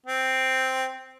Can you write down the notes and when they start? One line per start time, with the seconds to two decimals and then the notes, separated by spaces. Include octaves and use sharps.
0.06 C4